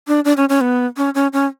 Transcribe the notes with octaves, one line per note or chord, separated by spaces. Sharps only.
D4
D4
C#4
C#4
B3
C#4
C#4
C#4